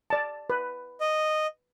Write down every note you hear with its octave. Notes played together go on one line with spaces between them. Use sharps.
D5 A5
B4
D#5